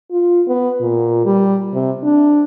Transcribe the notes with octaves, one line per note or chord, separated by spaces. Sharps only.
F4
B3
A#2
G3
C3
D4